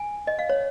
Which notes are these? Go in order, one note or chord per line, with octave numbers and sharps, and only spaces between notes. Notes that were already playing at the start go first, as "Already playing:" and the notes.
Already playing: G#5
D#5
F5
C#5